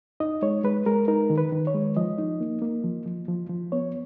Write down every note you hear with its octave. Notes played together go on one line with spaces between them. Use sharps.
D#4 D#5
G#3 C#5
G#3 B4
G#3 A#4
D#4 A#4
D#3
B4
D#3
C#5
G#3
F3 D#5
D#4
A#3
A#3
F3
F3
F3
F3
B3 C#5